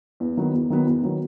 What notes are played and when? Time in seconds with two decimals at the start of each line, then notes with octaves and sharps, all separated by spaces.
0.20 E2
0.37 D#3 F#3 B3
0.53 E2
0.70 D#3 F#3 B3
0.86 E2
1.03 D#3 F#3 B3